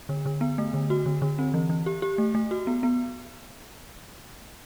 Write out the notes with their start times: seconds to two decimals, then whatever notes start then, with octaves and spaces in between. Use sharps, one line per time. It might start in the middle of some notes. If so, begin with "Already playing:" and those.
0.09 D3
0.26 D3
0.41 B3
0.58 A3
0.74 D3
0.90 F#4
1.06 D3
1.22 D3
1.39 C4
1.54 E3
1.69 E3
1.86 G4
2.02 G4
2.18 A3
2.35 A3
2.51 F#4
2.67 B3
2.83 B3